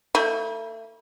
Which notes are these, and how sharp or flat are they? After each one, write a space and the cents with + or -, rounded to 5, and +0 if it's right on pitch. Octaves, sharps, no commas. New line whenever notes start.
A3 +35 E4 -35